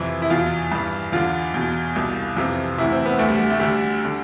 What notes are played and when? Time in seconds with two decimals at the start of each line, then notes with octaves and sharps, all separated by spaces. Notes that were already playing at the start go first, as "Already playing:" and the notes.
Already playing: F2 C3 E3 E4
0.22 E4
0.30 E2 B2 F4
0.72 G2 E3
1.12 E2 D3 F4
1.54 E2 B2
1.96 C2 B2
2.37 F2 C3 E3
2.78 D2 C3 E3 E4
2.92 C4
3.06 B3
3.19 D2 D3 A3
3.29 G3
3.39 G3
3.50 A3
3.60 D2 D3 G3
4.05 D3